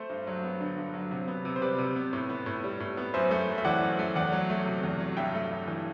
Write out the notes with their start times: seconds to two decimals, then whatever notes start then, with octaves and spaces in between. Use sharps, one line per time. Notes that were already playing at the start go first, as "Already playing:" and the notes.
Already playing: A3 C5
0.09 G2
0.27 F#3
0.44 B3
0.61 D3
0.78 G2
0.94 F#3
1.11 C3
1.28 B3
1.45 C3
1.56 C5
1.62 G3 B4 D5
1.78 C3
1.96 B3
2.13 A2
2.29 B3
2.46 A2
2.64 G3
2.80 A2
2.97 B3
3.14 F#2 C5 E5
3.31 A3
3.49 F#2
3.58 E5
3.65 E3 D5 F#5
3.82 F#2
3.99 A3
4.15 E2 D5 F#5
4.32 F#3
4.50 A3
4.66 C3
4.83 E2
5.00 F#3
5.17 G2 E5 G5
5.34 A3
5.52 G2
5.67 E3